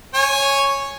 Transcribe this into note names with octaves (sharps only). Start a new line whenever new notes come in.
C#5 G#5